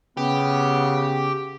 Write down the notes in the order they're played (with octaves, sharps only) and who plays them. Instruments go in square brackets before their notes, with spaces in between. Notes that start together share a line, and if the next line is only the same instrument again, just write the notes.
[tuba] C#3 [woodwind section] B3 [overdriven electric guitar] G4